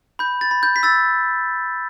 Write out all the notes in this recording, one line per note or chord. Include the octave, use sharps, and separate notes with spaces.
B5 G6
A6
B5
G6
B6
E6 A6